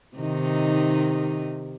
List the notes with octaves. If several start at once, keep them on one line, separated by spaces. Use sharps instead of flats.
C3 D#3 D#4